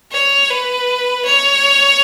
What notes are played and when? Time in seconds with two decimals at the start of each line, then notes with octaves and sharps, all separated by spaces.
0.12 C#5
0.50 B4
1.25 C#5